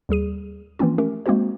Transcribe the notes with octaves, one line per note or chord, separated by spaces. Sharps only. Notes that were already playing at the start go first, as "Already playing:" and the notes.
D#2 G3 G#4 D#7
E3 F3 A#3 C4 C#4 F4
A3 C#4 G4 A#4
G#3 A#3 C4 D#4 F#4 C5